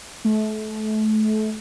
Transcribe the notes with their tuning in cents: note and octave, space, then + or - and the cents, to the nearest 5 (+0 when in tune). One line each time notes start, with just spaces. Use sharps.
A3 -30